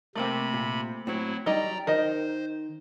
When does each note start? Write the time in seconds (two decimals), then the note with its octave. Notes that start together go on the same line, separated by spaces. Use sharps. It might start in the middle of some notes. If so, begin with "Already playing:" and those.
0.15 C3 A3 A#3 C4 B5
0.54 A#2
1.07 A2 F#3 C4 E4 F#4
1.46 F#3 G3 D#4 D5 D#5 G5 A#5
1.87 D#3 A#4 C5 D#5